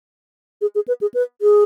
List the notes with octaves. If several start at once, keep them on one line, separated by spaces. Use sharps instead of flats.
G#4
G#4
B4
G#4
B4
G#4